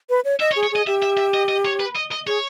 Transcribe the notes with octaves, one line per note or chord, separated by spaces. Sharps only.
B4
C#5
D#5 E5
C#5
G#4
C#5
G#4 D#5
G4 E5
E5
E5
D#5
D#5
C#5
B4
D#5
D#5
G#4 C#5